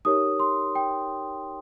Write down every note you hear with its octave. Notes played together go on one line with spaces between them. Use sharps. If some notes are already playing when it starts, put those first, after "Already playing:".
D#4 G4 A#4 C#5 D#6
C6
G5